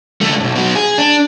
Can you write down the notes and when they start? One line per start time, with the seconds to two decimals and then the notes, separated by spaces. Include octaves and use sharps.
0.21 C#2 A3
0.40 B1 G2
0.55 B2 F#3
0.75 G#4
0.98 D4